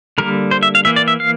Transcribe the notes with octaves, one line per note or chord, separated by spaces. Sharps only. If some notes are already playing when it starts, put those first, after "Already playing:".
D3 G3 A#3 A#4
C5
E5
F5
E3 A#3 E5
D5
E5
F5